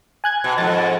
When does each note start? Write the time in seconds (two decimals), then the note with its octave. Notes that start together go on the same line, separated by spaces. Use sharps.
0.24 G#5 F#6 G#6
0.44 B2
0.58 F2 G#2 A6